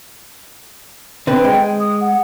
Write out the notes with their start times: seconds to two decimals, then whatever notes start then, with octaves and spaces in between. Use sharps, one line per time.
1.27 D3 C4 B4 G5
1.44 G#3
1.80 D#6
2.01 F#5